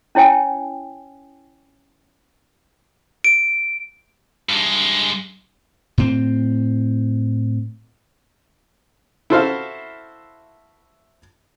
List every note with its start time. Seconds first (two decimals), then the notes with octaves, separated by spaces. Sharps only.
0.15 C#4 E4 C#5 G5 G#5
3.24 D7
4.49 G2 G#3
5.98 A2 C4
9.30 E4 F#4 A4 C5 E5 F5